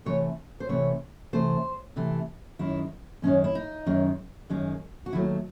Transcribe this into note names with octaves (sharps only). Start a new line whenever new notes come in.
C3 E3 A3 C#5
C5
C3 E3 A3 C#5
C3 E3 A3 C5
C3 E3 A3
F#2 D#3 G#3 E4
F#2 D#3 G#3 C#4
E4
D#4
F#2 D#3 G#3
F#2 D#3 G#3
F#4
D#2 D#3 F#3 A3 E4